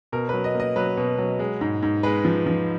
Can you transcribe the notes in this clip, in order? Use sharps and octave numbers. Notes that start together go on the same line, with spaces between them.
B2 A#4
F#3 B4
D#5
A#3 D#5
F#3 B4
B2
F#3
G#3
G#2
G#2
G#3 B4
F3
F3